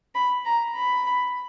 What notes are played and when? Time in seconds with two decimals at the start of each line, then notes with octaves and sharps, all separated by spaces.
0.15 B5
0.46 A#5
0.76 B5